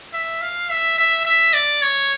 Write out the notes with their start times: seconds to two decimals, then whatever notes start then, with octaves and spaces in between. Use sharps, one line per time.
0.13 E5
0.42 F5
0.70 E5
0.98 E5
1.25 E5
1.53 D5
1.82 C#5